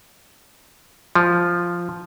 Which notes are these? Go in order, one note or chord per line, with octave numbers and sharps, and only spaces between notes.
F3